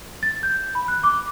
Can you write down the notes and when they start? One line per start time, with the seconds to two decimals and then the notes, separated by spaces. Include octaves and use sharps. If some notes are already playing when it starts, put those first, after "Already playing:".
0.23 A6
0.43 G6
0.75 B5
0.88 F#6
1.03 D6